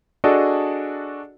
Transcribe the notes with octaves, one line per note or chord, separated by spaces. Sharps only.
D4 F#4 G#4 A4 D5 D#5